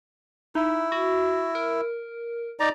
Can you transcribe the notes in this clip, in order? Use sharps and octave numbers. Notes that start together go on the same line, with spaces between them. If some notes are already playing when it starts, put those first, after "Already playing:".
D#4 E4
F#4
A#4
D#4 D5 A#5